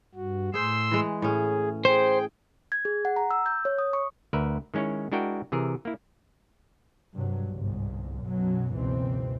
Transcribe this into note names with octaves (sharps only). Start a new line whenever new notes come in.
G2 F#4
A2 G#4 C5 C6 E6
E3 G#3
A2 C#4 G#4
G#4 C5 G5
G#6
G#4
F#5
A#5
E6
G6
C#5
D#6
C#6
D2 A#4 B4 E5
D#3 G#3 C#4 E4 C#5
G#3 D4 E4 F#4 A#4 G5
C3 E3 G#4 A#4
A#3 E4
G2 C3 F#3
G1 C2 G#2
B1 F#2 B2 F#3
F#1 C#2 B2 E3 C4